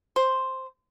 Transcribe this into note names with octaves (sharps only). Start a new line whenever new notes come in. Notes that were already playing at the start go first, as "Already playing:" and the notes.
C5